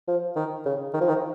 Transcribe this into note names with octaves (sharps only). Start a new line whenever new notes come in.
F3
D#3
C#3
D#3
F3
D#3